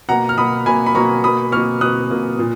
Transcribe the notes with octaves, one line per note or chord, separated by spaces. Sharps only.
B2 A#3 F#5 A#5
F6
B2 A#3 B5 D#6
B2 A#3 G#5 B5
B5
B2 A#3 A#5 C#6
B2 A#3 B5 D#6
B2 A#3 C#6 F6
B2 A#3 D#6 F#6
B2 A#3
A#2